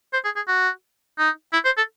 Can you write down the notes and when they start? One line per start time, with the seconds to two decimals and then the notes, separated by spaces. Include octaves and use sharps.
0.13 C5
0.25 G#4
0.36 G#4
0.48 F#4
1.19 D#4
1.53 E4
1.65 C5
1.77 A4